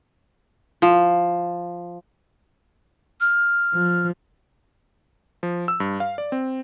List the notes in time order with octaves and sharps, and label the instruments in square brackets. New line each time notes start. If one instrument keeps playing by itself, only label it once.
[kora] F3
[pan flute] F6
[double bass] F3
[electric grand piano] F3
E6
G2
F5
D5
C4